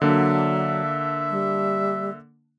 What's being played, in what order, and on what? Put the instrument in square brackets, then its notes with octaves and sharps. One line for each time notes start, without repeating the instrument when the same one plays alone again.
[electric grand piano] D3 A#3 D4 [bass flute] F#3 [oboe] E5
[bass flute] G3